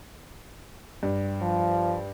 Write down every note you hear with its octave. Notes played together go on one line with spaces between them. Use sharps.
G2
F3